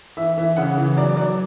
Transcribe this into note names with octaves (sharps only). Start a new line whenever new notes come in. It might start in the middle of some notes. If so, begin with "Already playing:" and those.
E3 E5
E3 E5
C#3 F#5
E3
F#3 D5
F#3 D5